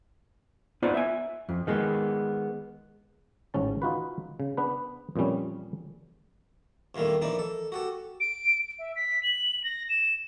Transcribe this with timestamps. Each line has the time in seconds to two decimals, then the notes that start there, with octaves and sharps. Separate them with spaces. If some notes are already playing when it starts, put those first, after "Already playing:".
0.82 B3 D#4 F4 B4 C5 D5
0.94 E5 G#5
1.49 F2
1.67 D#3 G#3 B3
3.54 A1 G#2 C#4 A5
3.82 D#4 F4 F#4 B4
4.40 C#3
4.57 B3 D4 B4
5.16 F2 A#2 E3 G3 C#4
6.95 E2 A#2 D#3 G3 A3
7.22 A#1 E3 D#4 D5
7.39 A4
7.72 F#4 G4 A4
8.20 D7
8.79 E5
8.96 B6
9.23 F#7
9.64 A#6
9.89 E7